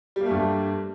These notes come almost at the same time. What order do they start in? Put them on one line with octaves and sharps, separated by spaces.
G3 A#3 A3 G2